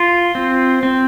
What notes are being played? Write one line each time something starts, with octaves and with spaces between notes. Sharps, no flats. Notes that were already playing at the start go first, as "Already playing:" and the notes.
Already playing: F4
C4
C4